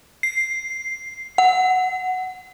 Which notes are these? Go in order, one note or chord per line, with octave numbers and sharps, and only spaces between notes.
C7
F#5